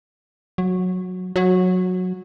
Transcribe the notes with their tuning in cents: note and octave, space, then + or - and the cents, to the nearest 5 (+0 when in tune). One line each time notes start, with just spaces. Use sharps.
F#3 -15
F#3 -15